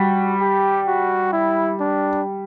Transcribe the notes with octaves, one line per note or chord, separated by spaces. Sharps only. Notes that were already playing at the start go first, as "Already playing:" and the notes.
Already playing: G3 F#4
G4
F#4
E4
D4